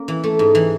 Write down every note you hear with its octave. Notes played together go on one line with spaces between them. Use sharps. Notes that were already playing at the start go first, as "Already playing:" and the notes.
Already playing: A#3 C#4
E3
A3
G#2
E3